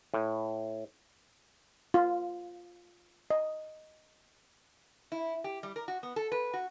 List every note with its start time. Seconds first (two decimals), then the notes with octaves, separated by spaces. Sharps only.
0.14 A2
1.94 F4
3.30 D#5
5.12 E4
5.44 G4
5.63 G3
5.76 A#4
5.88 F#4
6.03 B3
6.16 A4
6.32 B4
6.54 F#4